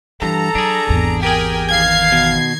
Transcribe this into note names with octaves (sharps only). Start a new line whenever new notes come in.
G2 E3 A4 A#5
F#3 D4 G#4
G#1 E2
G4 G#4 A#4 G5 G#5
D#3 F5 G#6 C7
B2